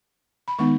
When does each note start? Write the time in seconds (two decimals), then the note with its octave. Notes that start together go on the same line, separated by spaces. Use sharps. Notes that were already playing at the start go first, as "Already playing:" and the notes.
0.48 B5
0.59 D#3 G#3 B3 D#4 C#6